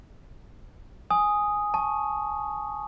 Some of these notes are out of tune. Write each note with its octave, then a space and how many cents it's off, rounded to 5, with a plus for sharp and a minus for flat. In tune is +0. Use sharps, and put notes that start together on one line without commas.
G#5 +0 D#6 +0
A5 -15 C#6 +0